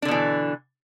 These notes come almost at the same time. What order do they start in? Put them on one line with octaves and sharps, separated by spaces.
D4 D3 B2 E3